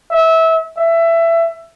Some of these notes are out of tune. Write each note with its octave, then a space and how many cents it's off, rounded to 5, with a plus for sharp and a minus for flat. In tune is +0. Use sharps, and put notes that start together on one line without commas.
E5 -25
E5 +20